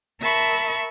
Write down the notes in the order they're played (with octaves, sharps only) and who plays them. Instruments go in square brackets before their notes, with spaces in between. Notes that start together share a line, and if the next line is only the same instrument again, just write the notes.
[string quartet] A#4 E5 A5 B5 C#6